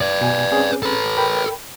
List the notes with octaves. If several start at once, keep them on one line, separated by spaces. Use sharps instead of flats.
B4 D5
B2 G#5
C4 C#4 G#4
A4 B4
A#4 G5 B5